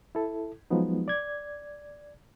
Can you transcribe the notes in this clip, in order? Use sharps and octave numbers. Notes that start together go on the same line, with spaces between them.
E4 A4
F3 F#3 G#3 B3 D#4
D5 G#6